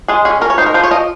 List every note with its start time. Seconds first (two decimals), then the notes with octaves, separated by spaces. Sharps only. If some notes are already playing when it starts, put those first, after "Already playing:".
0.08 G#3 G#4
0.25 C#4 G#4
0.41 C#4 A#4
0.50 C#5
0.58 D#4 C5
0.66 A#4
0.74 F3 C5
0.83 C#5
0.91 F3 D#5